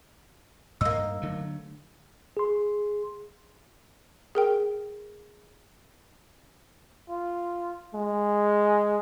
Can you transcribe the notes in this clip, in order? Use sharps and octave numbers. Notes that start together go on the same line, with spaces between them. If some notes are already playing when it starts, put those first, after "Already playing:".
G2 A#3 D#4 E6
D3 F#3 A3
G#4 C6
G#4 A#4 G5
F4
G#3